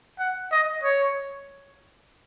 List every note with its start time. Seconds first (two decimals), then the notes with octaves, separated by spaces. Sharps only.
0.19 F#5
0.52 D#5
0.83 C#5